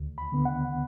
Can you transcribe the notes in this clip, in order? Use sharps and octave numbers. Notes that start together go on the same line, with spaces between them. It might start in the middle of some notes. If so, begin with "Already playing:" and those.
Already playing: D2
B5
D3 B3
F#5